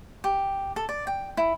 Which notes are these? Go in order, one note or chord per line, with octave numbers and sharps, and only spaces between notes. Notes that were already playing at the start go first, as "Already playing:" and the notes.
G4
A4
D5
G5
E4